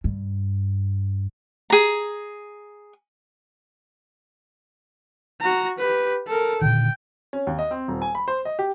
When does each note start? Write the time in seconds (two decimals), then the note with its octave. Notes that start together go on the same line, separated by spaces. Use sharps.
0.04 G2
1.70 G#4 A#5
5.41 F#4 A#5
5.78 G4 B4
6.27 A4 A#4
6.62 A#2 D3 D#3 G5
7.33 C#4
7.47 D#2
7.59 D#5
7.71 C4
7.88 D#1
8.02 G#5
8.15 B5
8.28 C5
8.45 D#5
8.59 G4